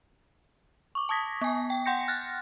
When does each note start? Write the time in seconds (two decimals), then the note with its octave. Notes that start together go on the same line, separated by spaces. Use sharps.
0.95 C#6 D6
1.09 A5 C#6 D#6 G#6 A#6 B6
1.41 B3 G#5
1.70 G5
1.86 F#5 G5 C6 G6 A#6 C#7
2.08 F6 F#6 A6 A#6